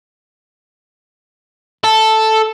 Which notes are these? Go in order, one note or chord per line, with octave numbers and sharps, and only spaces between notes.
A4